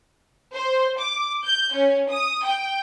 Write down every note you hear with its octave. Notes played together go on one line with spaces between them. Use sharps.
C5
D6
G6
C#4
D#6
G5